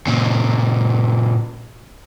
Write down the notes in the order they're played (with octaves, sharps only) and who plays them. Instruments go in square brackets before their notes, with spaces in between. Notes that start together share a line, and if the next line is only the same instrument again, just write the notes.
[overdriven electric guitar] A#2 C#3